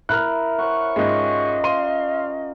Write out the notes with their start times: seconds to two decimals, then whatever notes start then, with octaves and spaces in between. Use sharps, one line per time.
0.09 E4 A#4 F6 F#6
0.58 C5 C#5 F#5 C#6
0.96 G#2 G#3 C#4 F4 G4 D#5
1.64 F5 C6 D#7